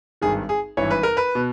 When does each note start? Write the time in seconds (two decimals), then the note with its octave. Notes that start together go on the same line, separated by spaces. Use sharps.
0.22 G#1 G2 D#3 G#4
0.49 G#4
0.77 G#1 G2 E3 C#5
0.91 B4
1.03 A#4
1.17 B4
1.35 B2